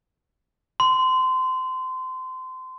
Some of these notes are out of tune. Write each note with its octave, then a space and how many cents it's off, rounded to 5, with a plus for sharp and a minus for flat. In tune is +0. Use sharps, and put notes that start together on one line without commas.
C6 -25